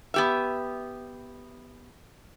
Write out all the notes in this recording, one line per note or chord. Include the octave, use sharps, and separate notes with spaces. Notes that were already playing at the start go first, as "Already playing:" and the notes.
B3 G4 E5